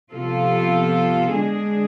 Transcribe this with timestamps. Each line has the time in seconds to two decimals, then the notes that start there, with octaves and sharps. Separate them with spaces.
0.12 C3 F3 B3 F4 A4
1.29 D3 G#3 D4 G#4